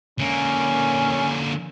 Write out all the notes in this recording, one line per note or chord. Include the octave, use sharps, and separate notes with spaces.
D3 A#3 C#4